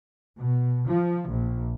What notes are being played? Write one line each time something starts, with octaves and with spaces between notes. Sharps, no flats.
B2
F3
A#1